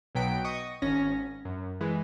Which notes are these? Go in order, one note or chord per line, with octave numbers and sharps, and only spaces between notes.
B1 B2 F#3 G5 B6 D7
D#5 C#6 D#6
G#1 C#4 A#6
F#2
E3 G#3